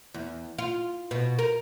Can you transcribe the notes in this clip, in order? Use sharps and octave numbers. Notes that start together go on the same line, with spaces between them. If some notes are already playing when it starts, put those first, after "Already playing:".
E2
F4
B2
A#4